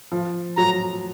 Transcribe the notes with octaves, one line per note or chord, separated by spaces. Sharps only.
F3
F#3 A#5